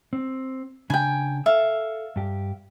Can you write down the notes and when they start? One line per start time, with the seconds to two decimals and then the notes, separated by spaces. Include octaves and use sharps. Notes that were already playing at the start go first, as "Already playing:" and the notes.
0.13 C4
0.90 C#3 D4 G5 G#5 B5
1.46 A4 E5 F5
2.16 G2 G4